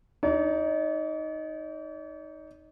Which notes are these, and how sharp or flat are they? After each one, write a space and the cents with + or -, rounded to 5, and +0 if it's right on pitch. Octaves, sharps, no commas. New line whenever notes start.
D#4 +5 D5 -45